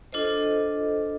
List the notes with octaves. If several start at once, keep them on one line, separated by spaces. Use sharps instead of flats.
D4 F4 A4 C5 D#5